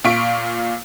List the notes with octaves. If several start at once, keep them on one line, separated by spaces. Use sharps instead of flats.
A#2 F4 C#6 B6 D7